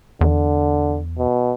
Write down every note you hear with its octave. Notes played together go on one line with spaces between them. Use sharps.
E2 D3
B2